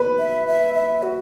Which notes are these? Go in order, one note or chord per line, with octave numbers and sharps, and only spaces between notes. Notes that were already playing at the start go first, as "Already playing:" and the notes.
Already playing: B4
E5
E5
E5
F#4